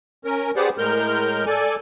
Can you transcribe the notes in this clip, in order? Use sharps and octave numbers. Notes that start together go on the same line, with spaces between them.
C#4 A#4
G4 G#4 B4 C5 D5 F#5
A2 G#3 A#4 F6 G6
A4 D5 G#5